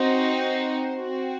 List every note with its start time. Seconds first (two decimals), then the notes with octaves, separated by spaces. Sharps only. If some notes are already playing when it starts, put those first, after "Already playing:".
Already playing: C4 D#4 F#4 C5
0.97 C4 F#4